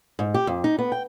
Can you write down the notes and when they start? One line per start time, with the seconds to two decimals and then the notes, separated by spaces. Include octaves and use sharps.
0.19 G#2
0.34 G4
0.47 F2
0.64 D#4
0.79 B3
0.92 G5